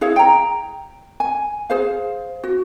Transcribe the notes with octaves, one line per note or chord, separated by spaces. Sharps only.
E4 G#4 C#5 F5
G5 A#5
G#5
G#4 C5 F5
F#4